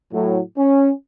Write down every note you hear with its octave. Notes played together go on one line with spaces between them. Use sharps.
A2 F#3
C#4